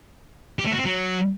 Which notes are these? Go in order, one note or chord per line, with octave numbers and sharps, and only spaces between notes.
G4
A3
F#4
C4
F#3